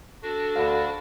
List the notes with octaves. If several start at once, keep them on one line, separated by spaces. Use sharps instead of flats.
D4 F#4 A4
D2 F5 F#5 B5